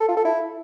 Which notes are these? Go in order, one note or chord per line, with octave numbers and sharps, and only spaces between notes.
A4
F4
A4
E4